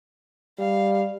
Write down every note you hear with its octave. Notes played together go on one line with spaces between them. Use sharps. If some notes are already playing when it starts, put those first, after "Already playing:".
G3 F5